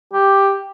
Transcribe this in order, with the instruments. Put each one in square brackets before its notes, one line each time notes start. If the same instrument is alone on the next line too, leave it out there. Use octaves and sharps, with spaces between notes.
[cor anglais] G4